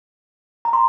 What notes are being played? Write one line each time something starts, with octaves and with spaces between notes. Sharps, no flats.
A#5
C6